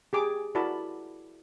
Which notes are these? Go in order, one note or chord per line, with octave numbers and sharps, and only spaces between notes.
G4 G#4 D6
E4 F#4 A#4 D5 A5 B5